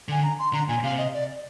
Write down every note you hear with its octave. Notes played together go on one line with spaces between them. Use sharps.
D3 G#5
A#5
C6
D3 A#5
A#2 G#5
C3 F5
D#5
D5